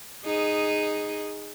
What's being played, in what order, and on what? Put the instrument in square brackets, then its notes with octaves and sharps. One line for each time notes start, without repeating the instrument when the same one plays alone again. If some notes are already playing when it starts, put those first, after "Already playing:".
[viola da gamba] D#4 G#4